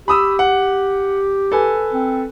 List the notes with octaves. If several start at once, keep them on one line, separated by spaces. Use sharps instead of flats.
G4 B5 D#6 E6
F#5
A4 B4 G#5
C4